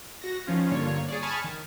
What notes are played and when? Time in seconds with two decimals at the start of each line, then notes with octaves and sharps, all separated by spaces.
0.22 F#4 A#6
0.47 D#3 F3 C#4 F4
0.71 G2 D3 A#3 F4 C#5
1.08 G#4 C#5 D5
1.22 G#5 A5 B5 C#6 D#6 F6
1.44 D#3